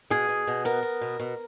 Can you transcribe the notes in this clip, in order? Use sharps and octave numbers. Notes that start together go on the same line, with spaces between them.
B2 G#4
B2
B2
B3 A#4
B3
B2
B2